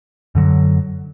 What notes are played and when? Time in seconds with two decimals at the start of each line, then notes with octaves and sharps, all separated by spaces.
0.35 F#2 D3 F#3